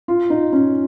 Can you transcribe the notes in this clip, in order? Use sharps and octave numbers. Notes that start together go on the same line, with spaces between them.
F4
D#4
C#4